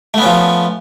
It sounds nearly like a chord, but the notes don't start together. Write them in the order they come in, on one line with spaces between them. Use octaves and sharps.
A3 B3 C#4 F3